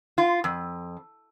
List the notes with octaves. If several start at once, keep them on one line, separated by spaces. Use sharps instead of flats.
F4
F2